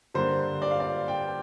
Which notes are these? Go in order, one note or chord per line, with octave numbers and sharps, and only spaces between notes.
G2 D3 G3 A#3 C5
D5
F5
D5
G5